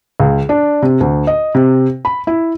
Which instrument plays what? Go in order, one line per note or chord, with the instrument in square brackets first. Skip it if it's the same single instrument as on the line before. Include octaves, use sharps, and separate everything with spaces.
[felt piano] C#2
D4
C3
D2
D#5
C3
B5
E4